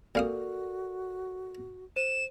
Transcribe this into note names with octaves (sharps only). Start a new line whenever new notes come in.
A#2 F#4 A4 A#4 D5 F5 D#6
C5 D#7 E7